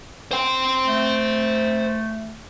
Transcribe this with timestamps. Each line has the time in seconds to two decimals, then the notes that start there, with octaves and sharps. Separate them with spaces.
0.31 C5 G5
0.85 A3